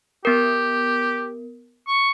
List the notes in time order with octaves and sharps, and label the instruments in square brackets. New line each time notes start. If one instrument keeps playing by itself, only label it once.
[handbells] B3 A#4 [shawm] G4
[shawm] C#6